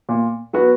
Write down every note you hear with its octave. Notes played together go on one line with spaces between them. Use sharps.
A#2
F#3 B3 F#4 B4